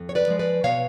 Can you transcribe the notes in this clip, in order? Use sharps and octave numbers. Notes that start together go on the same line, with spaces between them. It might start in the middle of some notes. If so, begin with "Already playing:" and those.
Already playing: F2
C#5
B4 D5
F3 G#3
B4 D5
B2 C#5 F5